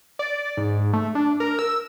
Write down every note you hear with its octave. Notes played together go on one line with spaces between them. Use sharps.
D5
G#2
A3
D4
A#4
E6